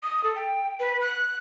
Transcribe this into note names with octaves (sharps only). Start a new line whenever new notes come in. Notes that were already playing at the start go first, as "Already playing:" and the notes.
D#6
A4
G5
B4
F#6